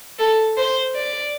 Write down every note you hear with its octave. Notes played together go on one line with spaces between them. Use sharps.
A4
C5
D5